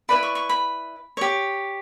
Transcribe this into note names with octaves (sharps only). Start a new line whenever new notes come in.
E4 B4 D5 B5
C#6
C#6
B5
G4 C#5